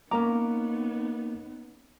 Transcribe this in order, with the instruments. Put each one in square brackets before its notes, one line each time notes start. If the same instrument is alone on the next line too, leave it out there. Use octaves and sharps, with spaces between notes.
[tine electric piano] A#3 D6 [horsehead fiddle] B3 D#4 [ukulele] C#4 A#5